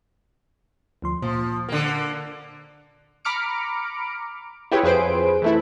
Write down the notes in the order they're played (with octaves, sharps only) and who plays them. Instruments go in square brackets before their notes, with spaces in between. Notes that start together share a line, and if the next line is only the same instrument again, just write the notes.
[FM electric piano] D2 F3 C6
[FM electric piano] A#2 [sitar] F3
[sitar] D3 A#3
[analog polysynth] A#5 B5 D6 F6 C#7 D7
E4 F4 G4 G#4 B4 C#5
F2 G#4 B4 C5 D7
E3 A3 E4